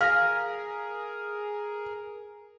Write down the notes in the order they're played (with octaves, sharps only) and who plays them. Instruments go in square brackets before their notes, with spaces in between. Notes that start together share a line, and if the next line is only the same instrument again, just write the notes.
[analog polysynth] G#4 A#4 [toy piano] F5 [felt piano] F6 A#6